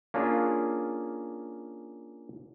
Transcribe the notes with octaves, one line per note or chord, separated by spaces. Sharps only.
A#3 C#4 D4 F4 G#4